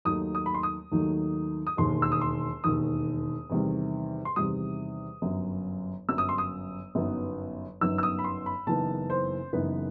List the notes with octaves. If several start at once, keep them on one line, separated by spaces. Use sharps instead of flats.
D#2 D#3 F#3 A3 D#4 D#6
D#6
B5
C6
D#6
D#2 D#3 F#3 A3 D#4
D#6
E1 D#2 D#3 C6
E6
D#6
C6
E1 D#2 D#3 D#6
E2 C3 D#3 G3
C6
E2 C3 D#3 G3 D#6
G1 F#2 F#3
G1 F#2 F#3 E6
D#6
C6
D#6
G1 F#2 F#3 B3 D#4
G1 F#2 F#3 B3 D#4 E6
E6
D#6
B5
C6
B5
F#1 F#2 E3 B3 D#4 A5
C5
F#1 F#2 E3 B3 D#4 B4